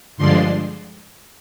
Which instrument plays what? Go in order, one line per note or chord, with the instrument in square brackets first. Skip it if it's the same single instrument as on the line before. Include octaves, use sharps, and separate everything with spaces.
[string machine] G2 D3 F3 G#3 D4 C6